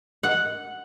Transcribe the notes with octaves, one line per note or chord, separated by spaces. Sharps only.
F#5